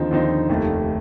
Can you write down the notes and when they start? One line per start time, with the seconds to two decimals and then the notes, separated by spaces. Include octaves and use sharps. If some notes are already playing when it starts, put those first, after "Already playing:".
Already playing: D#2 D3 F3 C4 D#4
0.11 D#2 D3 F3 C4 D#4
0.49 F1 D#2 D#3 A3